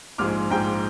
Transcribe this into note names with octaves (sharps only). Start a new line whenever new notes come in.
A#1 G#2 F3 G#3 D6 F6
A#1 G#2 F3 G#3 G5 A#5